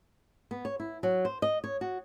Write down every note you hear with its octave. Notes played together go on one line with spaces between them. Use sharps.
B3
C#5
E4
F#3
C5
D#5
C#5
F#4